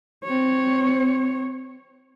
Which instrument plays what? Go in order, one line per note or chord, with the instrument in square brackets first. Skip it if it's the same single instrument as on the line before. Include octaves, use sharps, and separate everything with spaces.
[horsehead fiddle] C4 C#5